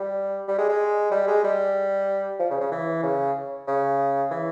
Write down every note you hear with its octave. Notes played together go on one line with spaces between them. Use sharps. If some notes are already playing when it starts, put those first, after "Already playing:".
Already playing: G3
G3
G#3
G#3
G3
G#3
G3
F3
C#3
C#3
E3
C#3
C#3
E3